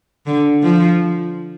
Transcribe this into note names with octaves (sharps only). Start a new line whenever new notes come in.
D3
F3